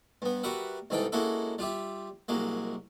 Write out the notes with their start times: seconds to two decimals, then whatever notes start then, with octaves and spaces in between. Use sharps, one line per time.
0.22 G2 B3
0.43 G3 F#4 A#4 B4 E5 F#5
0.90 C2 G#2 E3 D#4 A4 G5
1.12 G#3 A#3 C#4 E4 F#4 A4
1.58 G3 F4 G4 E5
2.28 C2 F#3 G#3 A#3